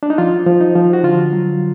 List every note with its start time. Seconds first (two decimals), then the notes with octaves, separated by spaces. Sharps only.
0.03 D4
0.10 D#4
0.18 F3 F4
0.47 F3
0.60 D#4
0.75 F3
0.93 F#4
1.03 D3 F4
1.33 F#3